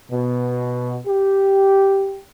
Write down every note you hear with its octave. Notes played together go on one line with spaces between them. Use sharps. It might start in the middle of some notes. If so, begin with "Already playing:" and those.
B2
G4